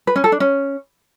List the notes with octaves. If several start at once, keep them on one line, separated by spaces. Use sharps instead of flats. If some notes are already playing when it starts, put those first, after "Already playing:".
B4
C#4
A4
D4
C#4